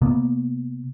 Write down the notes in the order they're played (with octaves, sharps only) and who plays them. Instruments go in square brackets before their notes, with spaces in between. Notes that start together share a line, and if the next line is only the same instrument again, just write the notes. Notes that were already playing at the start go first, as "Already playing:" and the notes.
[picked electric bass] C3 A#3 B3